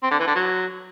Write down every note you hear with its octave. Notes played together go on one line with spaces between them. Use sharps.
C4
D3
E3
D3
F#3